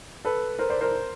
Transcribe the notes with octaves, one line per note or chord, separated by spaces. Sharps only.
A4 B4
A#4 C5
C5 D5
A#4 C5